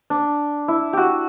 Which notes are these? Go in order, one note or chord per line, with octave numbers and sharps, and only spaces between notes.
D4
E4
F#4 G4